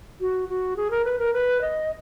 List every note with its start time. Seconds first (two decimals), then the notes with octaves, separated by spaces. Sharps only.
0.20 F#4
0.48 F#4
0.76 G#4
0.90 A#4
1.05 B4
1.19 A#4
1.33 B4
1.61 D#5